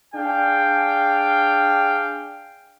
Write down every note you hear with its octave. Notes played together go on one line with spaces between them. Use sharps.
D4 G#4 F5 G5